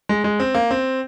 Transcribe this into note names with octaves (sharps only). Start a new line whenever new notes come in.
G#3
G#3
C4
A#3
C4